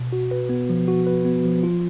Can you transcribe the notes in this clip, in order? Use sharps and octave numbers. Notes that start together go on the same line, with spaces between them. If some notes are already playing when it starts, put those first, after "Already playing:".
Already playing: B2
F#4
B4
B3
F3
F#4
B4
B3
F3
F4